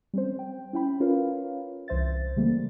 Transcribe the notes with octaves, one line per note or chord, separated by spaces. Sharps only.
G3 C4 C#4 C5
G5
C#4 E4 G5 B5
C#4 F4 A#4 B4 C#5 F5
C2 E3 C5 E5 A6
C#3 E3 G3 A3 A#3